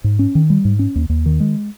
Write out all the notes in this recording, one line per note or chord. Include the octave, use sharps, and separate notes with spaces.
G#2
C#4
D#3
G3
G#2
C#4
D#2
D#2
D#3
G#3